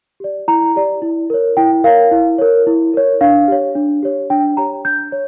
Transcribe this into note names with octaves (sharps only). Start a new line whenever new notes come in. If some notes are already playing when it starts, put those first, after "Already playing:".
G4 D5
E4 A#5
G4 D5
E4
A#4 C#5
E4 G5
A#4 C#5 F5
E4
A#4 C#5
E4
A#4 C#5
D4 F5
G4 C#5
D4
G4 C#5
D4 G5
G4 C#5 A#5
D4 G6
C#5